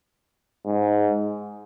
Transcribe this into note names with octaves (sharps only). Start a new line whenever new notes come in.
G#2